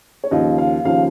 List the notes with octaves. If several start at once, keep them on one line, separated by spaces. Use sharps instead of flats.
C#5
D#2 C#3 F3 D#5
F5
D#2 C#3 F3 F5